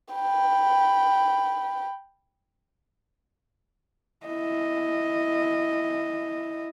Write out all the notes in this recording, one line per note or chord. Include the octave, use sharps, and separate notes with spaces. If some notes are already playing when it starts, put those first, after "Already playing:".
G5 B5
E4 D#5